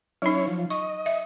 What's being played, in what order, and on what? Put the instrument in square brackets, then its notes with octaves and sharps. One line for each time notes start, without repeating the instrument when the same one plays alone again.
[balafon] F#3 D#4 [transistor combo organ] C#4 E4 C#5
[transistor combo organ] F3
[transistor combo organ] D#5 [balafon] C#6
[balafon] E5